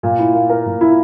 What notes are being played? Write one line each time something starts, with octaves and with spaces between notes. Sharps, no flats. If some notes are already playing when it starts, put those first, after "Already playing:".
A#2
E4
A#3
A#4
A#2
E4